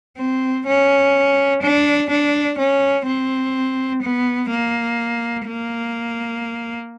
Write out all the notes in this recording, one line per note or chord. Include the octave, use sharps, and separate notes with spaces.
C4
C#4
D4
D4
C#4
C4
B3
A#3
A#3